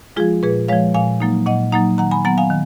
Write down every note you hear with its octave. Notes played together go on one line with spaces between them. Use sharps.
F3 G#3 F4 G#4
A#2 G#4 B4
F3 G#3 C#5 F5
A#2 F5 G#5
F#3 A#3 D#4
A#2 D#5 F#5
F#3 A#3 D#4 F#5 A#5
D#3 F#5 A#5
G#5 B5
F#3 B3 F#5 A#5
F5 G#5
D#3